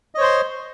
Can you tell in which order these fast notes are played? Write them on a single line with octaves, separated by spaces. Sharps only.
D#5 C#5 C5 C6